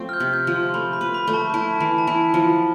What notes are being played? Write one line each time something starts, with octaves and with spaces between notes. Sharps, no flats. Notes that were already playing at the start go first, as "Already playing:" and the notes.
Already playing: F3 A3 C4
F6
G6
C3
G6
F3
C6
A3 B5
B5
B4
B5
A3
A5
E4 A5
E3 B5
A5
E4 B5
F3